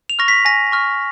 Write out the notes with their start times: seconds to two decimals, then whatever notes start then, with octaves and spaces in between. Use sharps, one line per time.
0.10 F7
0.19 C#6 F6 A#6
0.28 B6
0.45 G#5 A#6
0.72 C#6 F6